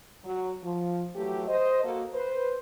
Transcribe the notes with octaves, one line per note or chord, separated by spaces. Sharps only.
F#3
F3
E3 F#3 A3 G4
C5 D#5
A#3 F#4 A4
B4 C5